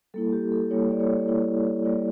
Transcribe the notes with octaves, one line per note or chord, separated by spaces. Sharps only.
G3 A#3 E4 A4
G4
A4
G3 A#3 E4 C#5
D5
C#5
G3 A#3 E4
G3 A#3 E4 D5